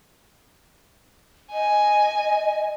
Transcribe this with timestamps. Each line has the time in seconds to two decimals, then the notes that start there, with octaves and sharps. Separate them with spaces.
1.53 D#5 G#5